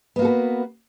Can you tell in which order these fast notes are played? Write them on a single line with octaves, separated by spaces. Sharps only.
B3 A#3 F#4 A4 B4